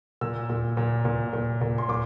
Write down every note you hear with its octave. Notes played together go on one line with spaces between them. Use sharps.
A#2 E6
A#2
A#2
A#2
A#2
A#2
C6
A#2 D6